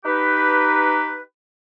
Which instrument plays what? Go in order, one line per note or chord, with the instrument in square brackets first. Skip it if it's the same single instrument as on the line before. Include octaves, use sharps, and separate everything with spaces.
[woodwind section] D#4 G4 B4